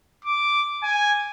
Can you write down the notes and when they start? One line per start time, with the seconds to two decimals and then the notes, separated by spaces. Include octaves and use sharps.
0.24 D6
0.83 G#5